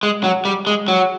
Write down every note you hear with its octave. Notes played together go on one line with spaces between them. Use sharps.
G#3
F#3
G3
G#3
F#3